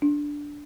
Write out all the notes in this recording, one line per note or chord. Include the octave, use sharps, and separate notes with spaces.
D4